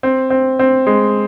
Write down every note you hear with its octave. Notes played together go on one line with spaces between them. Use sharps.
C4
C4
C4
G#3